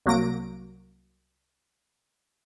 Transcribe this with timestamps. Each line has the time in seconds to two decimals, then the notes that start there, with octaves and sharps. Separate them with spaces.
0.06 C2 F#3 A#3 A#6 D7